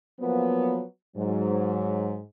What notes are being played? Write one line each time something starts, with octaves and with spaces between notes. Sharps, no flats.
F3 F#3 A#3 B3
G#2 F#3